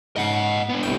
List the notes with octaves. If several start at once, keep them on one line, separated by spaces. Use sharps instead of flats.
G#2 C#3 D#5 F#5
B3 D4
C2 A2 G5